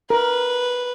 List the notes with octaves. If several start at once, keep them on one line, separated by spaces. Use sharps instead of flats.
A#4 B4